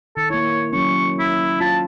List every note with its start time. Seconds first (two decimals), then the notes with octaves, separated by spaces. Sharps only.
0.17 D#3 A4
0.30 A#3 E4 C#5
0.73 F#3 C#4 C#6
1.19 E4
1.61 F4 A5